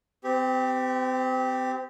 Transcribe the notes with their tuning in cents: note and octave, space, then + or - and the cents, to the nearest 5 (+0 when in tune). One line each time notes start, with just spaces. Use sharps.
C4 -35 G4 +0